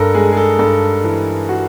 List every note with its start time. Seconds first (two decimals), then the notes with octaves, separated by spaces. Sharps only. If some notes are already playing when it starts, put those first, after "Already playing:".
Already playing: G2 A4 A#4
0.14 G#3 G#4
0.32 G#4
0.37 A4
0.59 G2 A4
1.04 E3
1.49 F#4